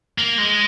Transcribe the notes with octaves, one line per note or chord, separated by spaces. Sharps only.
A#3
G#3